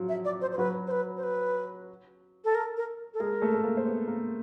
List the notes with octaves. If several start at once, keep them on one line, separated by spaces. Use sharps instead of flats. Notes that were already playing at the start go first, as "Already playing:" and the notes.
Already playing: F3 F#3 F4 F#4
E5
D5
C5
C5
F#3 F#4 B4
C5
B4
C5
B4
A4
A#4
A#4
A4
G#3 G#4 A#4
A3 A4
A4
A#3 A#4
C5
B3 B4
A#3 A#4